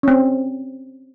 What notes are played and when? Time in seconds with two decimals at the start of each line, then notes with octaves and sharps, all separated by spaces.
0.03 C4 C#4